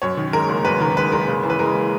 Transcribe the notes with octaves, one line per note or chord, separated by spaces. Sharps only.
F#2 C#5
D#3
G#3 A#4
F#1
F#2 B4
D#3 A#4
G#3 B4
F#1 A#4
C#3
E3
B4
G#3 A#4